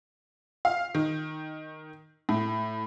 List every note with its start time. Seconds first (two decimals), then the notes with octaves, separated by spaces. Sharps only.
0.65 F5
0.95 D#3
2.29 A2